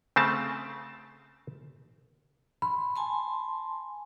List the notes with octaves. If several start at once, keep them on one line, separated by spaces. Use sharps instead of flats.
C#3 A3 C4 A5
B5 C6
G#5 A5 C6